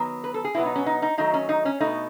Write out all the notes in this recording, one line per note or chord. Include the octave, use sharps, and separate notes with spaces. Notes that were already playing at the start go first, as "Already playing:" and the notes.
Already playing: D#3 F#3 B3
B4
A4
G#4
B2 F#3 B3 E4
D#4
C#4
D#4
D#4
D#3 F#3 A3 D#4
C#4
D#4
C#4
B2 A3 D#4